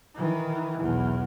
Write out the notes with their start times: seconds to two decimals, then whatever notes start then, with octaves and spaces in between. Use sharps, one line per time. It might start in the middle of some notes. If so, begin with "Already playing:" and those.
0.14 D#3 E3
0.81 B1 E2